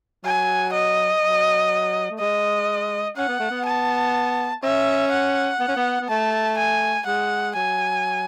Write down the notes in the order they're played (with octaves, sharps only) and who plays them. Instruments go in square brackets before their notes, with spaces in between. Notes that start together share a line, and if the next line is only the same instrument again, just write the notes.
[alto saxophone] F#3 [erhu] G#5
[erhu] D#5
[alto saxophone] F#3
A3
[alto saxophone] G#3 [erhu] D#5
[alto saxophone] C#4 [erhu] F#5
[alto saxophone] B3
A3
B3
[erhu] A5
[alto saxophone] C#4 [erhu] E5
[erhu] F#5
[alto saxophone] B3
C#4
B3
B3
[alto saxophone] A3 [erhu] A5
[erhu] G#5
[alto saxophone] G#3 [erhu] F#5
[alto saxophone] F#3 [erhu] G#5